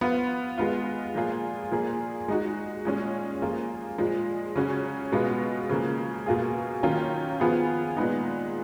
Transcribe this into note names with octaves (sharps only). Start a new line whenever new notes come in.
F3 B3 F4
G#3 B3 F4
A#2 F3 A#3 F4 G#4
A#2 F3 A#3 F4 G#4
G#3 D#4 F#4
A#2 G#3 C#4
F3 A#3 F4 G#4
A#2 F3 G#3
C#3 F#3 C#4 F#4
B2 G#3 B3 F4
C#3 F3 A#3
B2 A#3 F4 G#4
D#3 F#3 A#3 C#4 F4
F3 B3 F4 G#4
A#2 G#3 B3 D#4